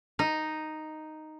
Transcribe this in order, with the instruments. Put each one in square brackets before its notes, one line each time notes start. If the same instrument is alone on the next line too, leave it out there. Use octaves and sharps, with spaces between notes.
[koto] D#4